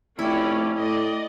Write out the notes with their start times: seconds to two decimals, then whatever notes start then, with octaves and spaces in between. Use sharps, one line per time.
0.19 F1 A3 C#4 E4 D5 G5
0.76 A2 D5 D#5